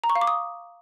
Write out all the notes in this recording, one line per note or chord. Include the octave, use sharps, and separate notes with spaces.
A#5
C#6
F5
D6
D#6